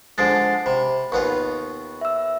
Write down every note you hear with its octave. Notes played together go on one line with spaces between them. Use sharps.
D3 F3 G#3 A6 C7 D7
C3 B5
D#2 B3 F4 C#6
E5 E6